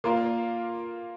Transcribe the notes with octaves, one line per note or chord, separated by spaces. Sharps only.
A#3 F4 A#4 D5 F5